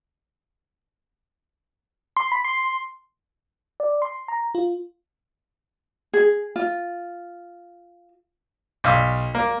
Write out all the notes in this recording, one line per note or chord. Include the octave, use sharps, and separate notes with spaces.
C6
B5
C6
D5
C6
A#5
F4
G#4
F4
B1 F5 E6
A#3